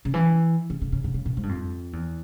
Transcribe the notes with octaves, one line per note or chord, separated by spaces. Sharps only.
C#3
E3
C#3
C#3
C#3
C#3
C#3
A#2
G#2
G2
F2
E2